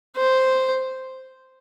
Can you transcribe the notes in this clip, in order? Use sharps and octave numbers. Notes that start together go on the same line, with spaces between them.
C5